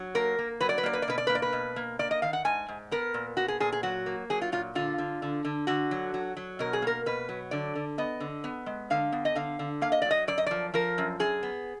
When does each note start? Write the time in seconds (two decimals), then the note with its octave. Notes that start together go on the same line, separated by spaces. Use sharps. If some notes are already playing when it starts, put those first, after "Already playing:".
Already playing: F#3
0.15 A#3 A#4
0.39 A#3
0.61 F#3 B4
0.69 D5
0.78 B4
0.83 A#3 D5
0.93 B4
1.02 D5
1.08 B2 B4
1.18 D5
1.27 A#3 B4
1.35 D5
1.42 B4
1.53 B2
1.76 A#3
1.99 A#3 D5
2.11 D#5
2.22 D#3 F5
2.33 F#5
2.45 G#2 G#5
2.68 G#2
2.91 B3 A#4
3.14 A#2
3.37 B3 F#4
3.48 G#4
3.60 A#2 G#4
3.72 G#4
3.83 F#3 F#4
4.06 A#3
4.30 F#3 G#4
4.42 F4
4.52 A#2 F4
4.75 D3 F4
4.98 D3
5.22 D3
5.45 D3
5.67 D3 F#4
5.91 F#3
6.14 F#3
6.37 F#3
6.59 B2 A#4
6.73 G#4
6.82 A#3 A#4
7.06 B2 B4
7.29 F#3
7.51 D3 D5
7.75 D3
7.98 B3 D#5
8.20 D3
8.44 B3
8.66 G#3
8.90 D3 F5
9.12 B3
9.25 D#5
9.35 D3 F5
9.59 D3
9.81 A#3 F5
9.92 D#5
10.02 F#3 D5
10.11 D#5
10.28 F#2 D5
10.38 D#5
10.46 F3 D5
10.74 F3 A#4
10.98 F#2
11.20 F#2 G#4
11.43 B3